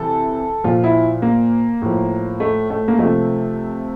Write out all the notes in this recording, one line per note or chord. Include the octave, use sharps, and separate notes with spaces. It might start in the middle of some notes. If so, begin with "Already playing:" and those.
Already playing: C3 E3 A4
A#2 F3 F4
E4
A#3
A2 F3
A3
A3
A#3
C3 F3 A3